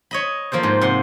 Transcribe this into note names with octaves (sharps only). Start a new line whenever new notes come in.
C#5 D#5 B5
F3 A#3 A4 C5
G#2
C3 F#5 C6